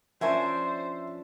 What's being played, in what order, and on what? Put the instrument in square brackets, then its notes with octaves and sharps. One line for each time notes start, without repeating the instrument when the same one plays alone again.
[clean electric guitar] F3 C#4 D4 [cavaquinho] A#4 G#5 C#6 [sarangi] C5 [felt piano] E5